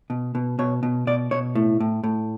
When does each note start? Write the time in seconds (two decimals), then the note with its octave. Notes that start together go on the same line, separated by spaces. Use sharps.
0.10 B2
0.35 B2
0.59 B2 C#5
0.83 B2
1.07 B2 D5
1.31 B2 C#5
1.55 A2
1.80 A2
2.04 A2